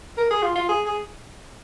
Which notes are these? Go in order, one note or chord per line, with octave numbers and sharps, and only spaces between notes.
A#4
G#4
F4
F4
G#4
G#4